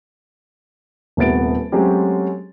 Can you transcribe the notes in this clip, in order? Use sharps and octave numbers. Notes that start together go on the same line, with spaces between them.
D#1 C3 A3 B3 A6 D7
F#3 G#3 A3 C4 C#4 G4